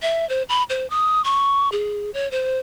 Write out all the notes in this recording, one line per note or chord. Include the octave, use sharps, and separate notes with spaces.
E5
C5
B5
C5
D#6
C#6
G#4
C#5
C5